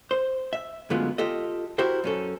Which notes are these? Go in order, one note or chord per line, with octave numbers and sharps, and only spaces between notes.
C5
E5
F#2 D3 G#3 A3 B3 F4
F4 G4 A4 D#5
E4 F#4 G4 A#4 C5 E5
F#2 C#4 A4